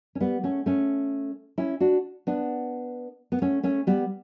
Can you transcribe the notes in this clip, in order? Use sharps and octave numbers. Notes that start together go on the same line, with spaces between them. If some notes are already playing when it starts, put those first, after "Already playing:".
C#4
G3 B3
A3 C#4
A3 C#4
C#4 E4
D4 F#4
B3 D4
B3
A3 C#4
A3 C#4
G3 B3